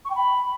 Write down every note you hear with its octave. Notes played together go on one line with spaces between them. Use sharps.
C#6
G5
B5